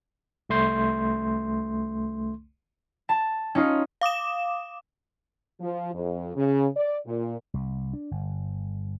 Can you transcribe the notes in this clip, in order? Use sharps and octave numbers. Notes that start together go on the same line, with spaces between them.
C2 A3 C6 G6
A5
C#4 D#4 F4
F5 D6 D#6 E7
F3
F2
C#3
D5
A#2
C2
D4
G1